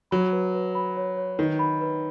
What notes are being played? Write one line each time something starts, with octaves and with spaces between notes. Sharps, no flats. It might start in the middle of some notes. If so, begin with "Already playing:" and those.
F#3 B5
B4
B4
B5
C#5
C#5
D#3 B4
B5
B4